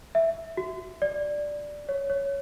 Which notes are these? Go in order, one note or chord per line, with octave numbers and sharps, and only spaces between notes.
E5
F#4
D5
C#5
C#5